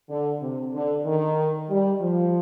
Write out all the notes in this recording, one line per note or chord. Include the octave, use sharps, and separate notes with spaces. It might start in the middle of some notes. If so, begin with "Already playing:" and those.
D3
C3
D3
D#3
G3
F3